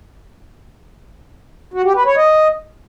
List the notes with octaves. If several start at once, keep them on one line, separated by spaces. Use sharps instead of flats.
F#4
G4
B4
C#5
D#5